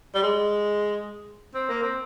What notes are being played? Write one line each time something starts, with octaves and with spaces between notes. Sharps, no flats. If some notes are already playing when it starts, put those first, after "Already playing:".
G3
G#3
C4
A#3
C4